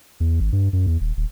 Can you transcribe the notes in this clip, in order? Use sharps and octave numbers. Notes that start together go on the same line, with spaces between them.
E2
G#1
G2
F#2
E2
D#1
D#1